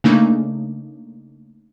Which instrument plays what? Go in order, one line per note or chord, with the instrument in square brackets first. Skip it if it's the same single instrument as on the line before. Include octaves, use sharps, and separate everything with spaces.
[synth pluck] C#3 A3 A#3 D4 D#4